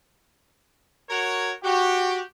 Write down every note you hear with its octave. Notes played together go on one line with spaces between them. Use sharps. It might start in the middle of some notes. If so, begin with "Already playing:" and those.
F#4 A#4 C#5
F#4 G4